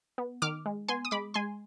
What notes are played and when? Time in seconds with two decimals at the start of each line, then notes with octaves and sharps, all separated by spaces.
0.18 B3
0.42 D#3 D6 F6
0.66 G#3
0.88 B3 G#5 C6
1.05 D#6
1.11 G#3 B5 D6
1.34 G#3 G#5 C6